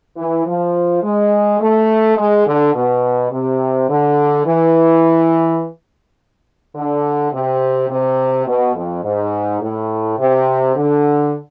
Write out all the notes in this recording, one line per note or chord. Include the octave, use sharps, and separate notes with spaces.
E3
F3
G#3
A3
G#3
D3
B2
C3
D3
E3
D3
C3
C3
B2
F2
G#2
A2
C3
D3